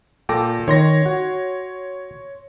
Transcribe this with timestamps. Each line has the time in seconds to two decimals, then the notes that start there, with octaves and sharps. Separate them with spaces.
0.29 A#2 A4 G5 D6 A#6
0.68 D#3 C#5 C6 A#6
1.06 F#4